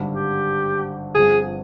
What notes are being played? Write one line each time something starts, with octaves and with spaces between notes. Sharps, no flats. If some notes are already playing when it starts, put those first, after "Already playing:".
Already playing: G#1 G2 D3 G3
G4
G1 G2 F3 C4 G#4